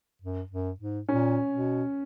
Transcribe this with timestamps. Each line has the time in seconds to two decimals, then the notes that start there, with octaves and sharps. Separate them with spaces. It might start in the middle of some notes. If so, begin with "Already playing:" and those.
0.22 F#2
0.51 F#2
0.80 G#2
1.09 A#2 C#4
1.53 B2